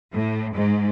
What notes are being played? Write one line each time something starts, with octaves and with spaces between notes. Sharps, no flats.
A2
G#2